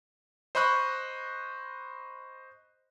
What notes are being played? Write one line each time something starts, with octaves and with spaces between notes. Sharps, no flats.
C5 D#5 B5 C#6 F#6